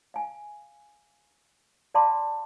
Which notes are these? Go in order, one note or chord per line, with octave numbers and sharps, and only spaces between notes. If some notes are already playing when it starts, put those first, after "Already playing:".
F5 G#5
D5 F5 A5 B5 C6 D6